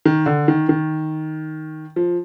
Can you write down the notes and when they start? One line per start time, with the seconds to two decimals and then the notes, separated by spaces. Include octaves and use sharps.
0.05 D#3
0.26 D3
0.48 D#3
0.69 D#3
1.96 F3